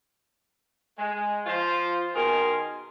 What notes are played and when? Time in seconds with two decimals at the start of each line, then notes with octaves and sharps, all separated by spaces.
0.99 G#3
1.46 F3 F4 C5
2.14 B2 D#3 G#4 A#4 G#5 C6